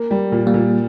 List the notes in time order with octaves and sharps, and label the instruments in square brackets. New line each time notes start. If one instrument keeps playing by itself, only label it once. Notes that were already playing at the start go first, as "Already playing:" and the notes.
Already playing: [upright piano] A#3
G3
A#2
[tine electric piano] G3 A#3
[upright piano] A#2